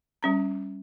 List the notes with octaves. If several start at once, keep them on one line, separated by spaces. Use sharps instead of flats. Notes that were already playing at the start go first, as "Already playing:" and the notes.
G3 C#4 A#5